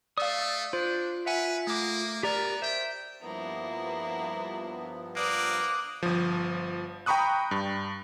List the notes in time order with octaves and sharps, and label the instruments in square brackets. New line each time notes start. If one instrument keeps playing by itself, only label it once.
[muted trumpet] A3 [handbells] D5 F5 [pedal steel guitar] D#6 E6
[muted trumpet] D4 [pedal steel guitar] F4 [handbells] C5
[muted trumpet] B4 [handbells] E5 F#5 G#5
[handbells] A3 D6 [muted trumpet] A#3
[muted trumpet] B3 [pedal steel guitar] G4 A#4 [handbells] D5 A#5 A6
[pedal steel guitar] C5 [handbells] E5 [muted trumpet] G5
[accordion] G2 F3 B3 [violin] A#3 E4
[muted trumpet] A#3 [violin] B4 D5 [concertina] D6 D#6 F#6
[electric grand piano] G1 F3
G5 A#5 B5 C#6 D#6 F#6
G2